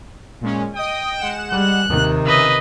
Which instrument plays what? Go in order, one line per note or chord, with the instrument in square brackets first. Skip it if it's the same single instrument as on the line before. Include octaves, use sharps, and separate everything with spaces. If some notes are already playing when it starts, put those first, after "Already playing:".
[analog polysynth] A#2 G#3 C#4
[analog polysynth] D#5 D#6 [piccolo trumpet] G5
[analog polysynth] G#3 F#5 E7
[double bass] G3 [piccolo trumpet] F#6
[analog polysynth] D#2 [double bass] C3 D#3
[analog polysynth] C#3 [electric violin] B4 D#5 [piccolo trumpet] E5